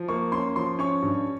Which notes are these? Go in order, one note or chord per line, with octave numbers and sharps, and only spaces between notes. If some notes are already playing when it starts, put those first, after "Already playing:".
Already playing: F3
A#3 C#6
C#4 C6
F3 C6
C#4 C#6
G2